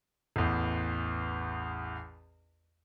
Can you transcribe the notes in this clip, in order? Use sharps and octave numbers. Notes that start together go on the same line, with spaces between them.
A1 E2